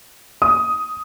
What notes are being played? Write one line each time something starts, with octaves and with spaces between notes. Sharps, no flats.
D#6